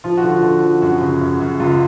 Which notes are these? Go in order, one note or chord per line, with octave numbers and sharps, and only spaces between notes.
F3 F4
F#4
D3
F4
D3
F3
F#2 F#4
C#3
F#2
F#2
C#2 F4